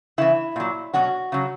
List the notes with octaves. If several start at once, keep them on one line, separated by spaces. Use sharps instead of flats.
C#3 E3 E4
A#2 F#3
B2 F#3 F#4
C#3 F#3